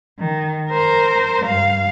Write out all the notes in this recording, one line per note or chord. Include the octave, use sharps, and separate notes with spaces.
D#3
A#4 C5
G2 F5